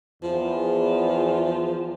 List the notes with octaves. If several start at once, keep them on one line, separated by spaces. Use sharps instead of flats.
E2 F3